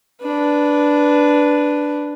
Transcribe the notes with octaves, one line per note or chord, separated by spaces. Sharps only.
D4 B4